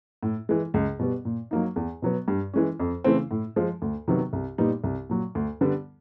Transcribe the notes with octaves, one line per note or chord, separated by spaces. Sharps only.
A2
E3 G#3
C#2
B2 G3 B3
A#2
F#3 A#3 D#4
E2
B2 F#3 B3
G2
E3 G#3 C#4
F2
C#3 E3 A3 C4
A2
F3 G#3
D2
C3 D#3 F#3 B3
C2
A#2 G3 B3 D#4
C2
A#2 F#3
D2
D3 G3 B3